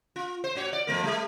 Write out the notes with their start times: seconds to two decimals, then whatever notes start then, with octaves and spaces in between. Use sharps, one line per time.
0.16 F4
0.44 C5
0.55 A#2 F#4 C#5
0.73 D5
0.87 F2 A3 A#4
1.04 G3 A3